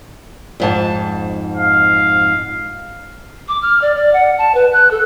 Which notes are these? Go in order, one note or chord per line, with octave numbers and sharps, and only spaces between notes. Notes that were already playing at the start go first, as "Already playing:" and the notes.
F2 G#2 A5
F5
D6
F6
D5
D5
F#5
A5
B4
F#6
A4